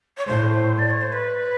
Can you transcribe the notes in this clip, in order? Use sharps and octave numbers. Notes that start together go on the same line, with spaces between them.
C#5
A2 C5
D5
C#5
C5
B4